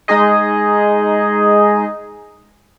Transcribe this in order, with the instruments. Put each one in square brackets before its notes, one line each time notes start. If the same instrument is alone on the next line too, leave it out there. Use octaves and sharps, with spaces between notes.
[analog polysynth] G#3 D#4 G#4 D#5